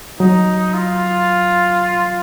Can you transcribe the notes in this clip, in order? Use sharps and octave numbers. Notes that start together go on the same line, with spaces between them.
F#3 D#4
F4